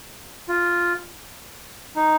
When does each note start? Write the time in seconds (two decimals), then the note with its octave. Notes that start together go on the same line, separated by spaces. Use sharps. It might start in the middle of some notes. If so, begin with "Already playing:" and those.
0.49 F4
1.96 D#4